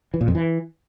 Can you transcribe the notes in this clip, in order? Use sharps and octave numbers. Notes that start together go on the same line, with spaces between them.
E3
A#2
F2
E3